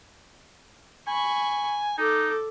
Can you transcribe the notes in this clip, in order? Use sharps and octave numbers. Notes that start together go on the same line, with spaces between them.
G#5 B5 C#6
D#4 A4 D6